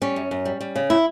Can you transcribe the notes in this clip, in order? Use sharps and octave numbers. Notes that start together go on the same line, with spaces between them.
G3 C#4
F#2
F#2
G3
G3
C#3
E4